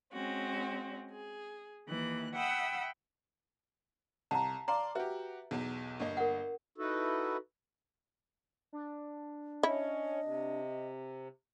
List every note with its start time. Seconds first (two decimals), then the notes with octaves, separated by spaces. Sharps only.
0.14 G#3 C4 C#4 F#4
1.12 G#4
1.87 D#2 E3 F#6
2.34 E5 F#5 G5 B5 D#6 E6
4.31 C2 A5 A#5
4.68 D5 F5 A#5 C6
4.95 F#4 G4 B4 E5
5.51 B1 E2
6.00 G1 A#3 D#5
6.17 A#4 F#5
6.78 D#4 E4 F#4 A4 B4
8.73 D4
9.63 C#4 E4 D#5
10.23 C3